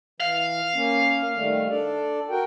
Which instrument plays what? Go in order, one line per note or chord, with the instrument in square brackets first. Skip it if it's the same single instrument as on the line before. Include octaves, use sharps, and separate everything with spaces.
[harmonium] E3 [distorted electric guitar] F5
[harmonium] A#3 C#4
D#3 G3 A3
D4 A4 D5
F#4 A#4 G5